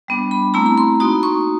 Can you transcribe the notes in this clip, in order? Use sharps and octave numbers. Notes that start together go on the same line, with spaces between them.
G3 B3 D4
B5
A3 C4 E4 A#5
B5
C6
A#3 D#4 F#4 D#6
C#6